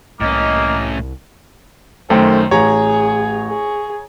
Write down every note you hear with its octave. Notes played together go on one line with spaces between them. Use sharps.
C2 A2 A#3 C#4 D#5
F#2 D#3 A3 C5 G5
A1 G#4 C#5 A#5
G#4